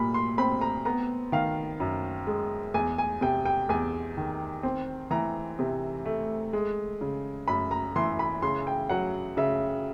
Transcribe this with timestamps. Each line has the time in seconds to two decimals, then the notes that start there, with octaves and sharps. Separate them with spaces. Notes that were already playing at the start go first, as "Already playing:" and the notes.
Already playing: A#2 G3 B5
0.14 C6
0.38 C4 B5
0.61 A#5
0.85 B3 A#5
1.32 D#3 F5
1.80 F#2
2.27 G#3
2.74 E2 G#5
2.98 G#5
3.21 C3 G5
3.45 G5
3.69 E2 G#5
4.17 D#3
4.63 C4
5.11 E3 A#5
5.59 C3
6.05 A3
6.53 G#3
7.01 C#3
7.48 F#2 B5
7.71 A#5
7.96 E3 C6
8.19 B5
8.42 C#3 C6
8.67 G5
8.89 F#3 F#5
9.37 C#3 E5